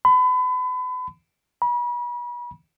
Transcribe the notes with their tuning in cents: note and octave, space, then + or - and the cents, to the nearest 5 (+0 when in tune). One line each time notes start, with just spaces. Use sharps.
B5 +35
B5 -35